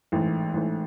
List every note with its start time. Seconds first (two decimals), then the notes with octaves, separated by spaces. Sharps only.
0.12 A1 G#2 E3 A3
0.53 A1 G#2 E3 A3